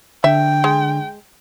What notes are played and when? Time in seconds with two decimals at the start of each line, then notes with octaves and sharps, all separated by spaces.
0.24 D3 D4 E5 G5
0.64 G#3